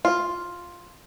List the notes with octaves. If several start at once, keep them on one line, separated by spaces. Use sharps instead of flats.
F4